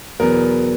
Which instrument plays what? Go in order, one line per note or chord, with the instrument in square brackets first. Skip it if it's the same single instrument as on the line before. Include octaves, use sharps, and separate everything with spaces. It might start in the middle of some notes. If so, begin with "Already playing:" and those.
[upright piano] E2 B2 F#3 B3 A#4